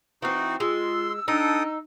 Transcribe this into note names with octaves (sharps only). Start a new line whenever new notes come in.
E3 C4 D#4 F#4
G#3 F4 C6 E6
D4 D#4 A4 G5 D#6